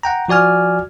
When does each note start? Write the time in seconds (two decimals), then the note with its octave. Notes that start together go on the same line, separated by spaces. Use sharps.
0.03 F#5 G5 A#5
0.28 F3 F#4 D5 G#5 F6